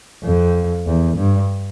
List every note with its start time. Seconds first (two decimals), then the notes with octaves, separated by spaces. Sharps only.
0.24 F2
0.87 E2
1.17 G2